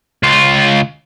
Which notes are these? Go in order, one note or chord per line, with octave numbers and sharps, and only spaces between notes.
C#2 F4